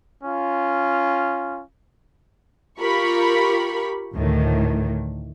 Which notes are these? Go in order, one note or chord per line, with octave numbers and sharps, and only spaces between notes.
C#4 F4
F4 G4 A#4 B5 C#6
D2 A2 D#3 E3